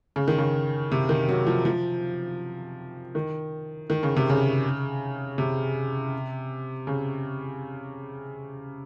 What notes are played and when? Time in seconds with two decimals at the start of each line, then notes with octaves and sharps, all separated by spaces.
0.16 C#3
0.28 D#3
0.38 C#3
0.92 C3
1.09 D#3
1.29 F#3
1.47 F3
1.65 F3
3.15 D#3
3.90 D#3
4.03 C#3
4.16 C3
4.30 C#3
5.38 C3
6.87 C#3